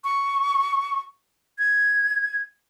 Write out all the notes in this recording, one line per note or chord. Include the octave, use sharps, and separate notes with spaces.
C#6
G#6